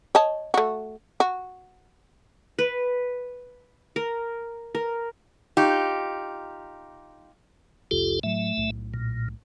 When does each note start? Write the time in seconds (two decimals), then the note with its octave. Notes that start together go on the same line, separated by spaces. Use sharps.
0.15 C#5 D#5 A5
0.54 A3 F#4
1.20 F#4
2.59 B4
3.96 A#4
4.75 A#4
5.57 D#4 F4 G4
7.91 F1 C2 F2 F4 G4 A4
8.23 A2 F#3 A3 E5
8.57 B1 A2
8.94 A#2